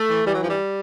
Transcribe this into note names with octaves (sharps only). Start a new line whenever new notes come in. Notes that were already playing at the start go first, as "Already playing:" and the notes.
Already playing: A3
E3
E3 G3
F#3
G2 F3
G3